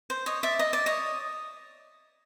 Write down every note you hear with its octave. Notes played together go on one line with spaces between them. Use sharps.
C5
C#5 D#5
D5 E5
D#5
D5
C#5 D#5